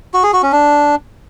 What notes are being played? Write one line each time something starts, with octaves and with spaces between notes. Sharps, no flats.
F#4
G#4
F#4
C#4
D4